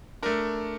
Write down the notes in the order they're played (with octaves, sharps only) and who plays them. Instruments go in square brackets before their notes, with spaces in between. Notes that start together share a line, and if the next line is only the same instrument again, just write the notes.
[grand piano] A3 D4 A#4